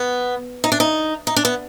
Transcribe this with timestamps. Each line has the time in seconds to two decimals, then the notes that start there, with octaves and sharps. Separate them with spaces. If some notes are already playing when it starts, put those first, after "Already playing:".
Already playing: B3
0.64 D#4
0.72 D4
0.80 D#4
1.27 D#4
1.36 D4
1.45 B3